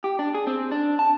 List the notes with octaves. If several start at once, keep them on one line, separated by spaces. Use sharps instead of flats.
G4
D4
G#4
C4
D4
A5